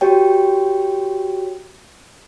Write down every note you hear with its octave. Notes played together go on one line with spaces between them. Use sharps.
F#4 G4 C#5 G5